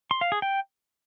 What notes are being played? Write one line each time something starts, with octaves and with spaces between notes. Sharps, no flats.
C6
F5
G#4
G5